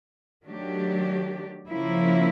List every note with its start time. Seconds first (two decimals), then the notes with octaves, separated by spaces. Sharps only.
0.45 D#3 F#3 A3 D4 G4
1.68 C#3 F3 A#3 C#4 E4